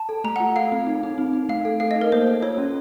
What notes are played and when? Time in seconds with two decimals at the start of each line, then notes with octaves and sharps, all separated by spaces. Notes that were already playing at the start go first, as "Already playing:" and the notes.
Already playing: A5
0.09 A4
0.24 A3 A#5
0.36 F4 F#5
0.56 A4 F5
0.72 C4
0.87 D#4
1.03 D#4
1.18 C4
1.33 D#4
1.49 A3 F5
1.65 A4
1.80 A4 F5
1.91 D#4 D#5
2.01 A#4
2.12 A#3 C5
2.27 A4
2.42 F4 C#5
2.58 C#4